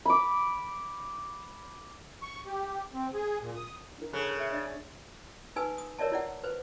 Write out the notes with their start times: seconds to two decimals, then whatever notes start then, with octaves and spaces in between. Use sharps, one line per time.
0.05 B5 D6
2.22 C#6
2.46 G4
2.94 C4
3.14 G#4
3.41 A#2
3.55 D#6
3.98 D4 E4 A#4
4.13 C#3 A4 F#6
4.39 E5
4.52 D4 D5 E5 A6
5.56 D#4 B4 G#5 E6
5.78 D#6
5.99 A#4 C#5 D5 E5 A5
6.12 E4 D5 F#5
6.44 B4 C5